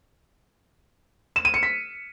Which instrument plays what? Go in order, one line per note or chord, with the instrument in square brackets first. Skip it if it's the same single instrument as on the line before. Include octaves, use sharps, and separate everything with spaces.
[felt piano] E7
D#7
C#7
B6